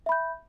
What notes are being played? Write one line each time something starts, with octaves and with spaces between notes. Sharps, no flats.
E5 B5 G6